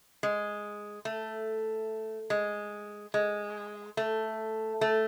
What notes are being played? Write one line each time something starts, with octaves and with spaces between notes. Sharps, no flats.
G#3
A3
G#3
G#3
A3
A3